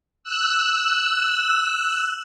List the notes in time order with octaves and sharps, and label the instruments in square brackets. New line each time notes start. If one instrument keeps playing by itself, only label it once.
[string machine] E6 F#6